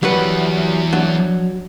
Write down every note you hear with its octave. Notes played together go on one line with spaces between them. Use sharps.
E2 F#3 G3 B4 F#5
F#3 D4